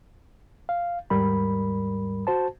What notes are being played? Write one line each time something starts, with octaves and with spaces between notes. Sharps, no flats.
F5
D#2 G#2 G3 A#4 B5
F#4 C5 A5